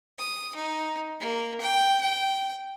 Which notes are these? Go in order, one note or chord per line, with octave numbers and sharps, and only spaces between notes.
D#6
D#4
A#3
G5
G5